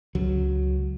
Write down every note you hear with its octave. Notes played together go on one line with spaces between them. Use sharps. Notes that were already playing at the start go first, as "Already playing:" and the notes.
C#2 F#3